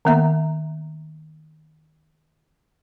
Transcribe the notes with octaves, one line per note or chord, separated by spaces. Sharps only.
D#3 A#3 B3 E5 A#5